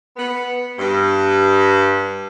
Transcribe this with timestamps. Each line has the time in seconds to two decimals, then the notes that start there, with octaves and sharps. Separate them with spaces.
0.17 B3
0.78 G2